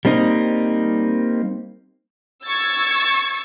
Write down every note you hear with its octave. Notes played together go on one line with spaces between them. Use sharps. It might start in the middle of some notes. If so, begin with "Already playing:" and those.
G3 A#3 C4 D#4
C#6 E6 G#6 A6